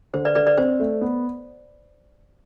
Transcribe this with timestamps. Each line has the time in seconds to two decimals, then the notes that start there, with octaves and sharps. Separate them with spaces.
0.13 D3 C5
0.25 B4 D5
0.35 D3 B4 D5
0.47 B4 D5
0.58 C4 C5
0.80 A3
1.01 B3